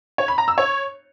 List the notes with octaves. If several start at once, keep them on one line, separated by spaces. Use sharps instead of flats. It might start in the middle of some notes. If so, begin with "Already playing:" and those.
C#5
B5
A#5
E6
C#5